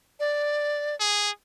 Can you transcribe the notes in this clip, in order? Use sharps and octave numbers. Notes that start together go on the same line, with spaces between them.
D5
G#4